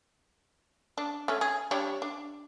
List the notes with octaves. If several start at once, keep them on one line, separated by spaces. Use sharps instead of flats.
D4
A3 C#4
G#4
G3 D4 C#5
D4